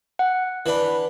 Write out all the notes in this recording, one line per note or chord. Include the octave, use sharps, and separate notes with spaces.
F#5
E3 D4 B4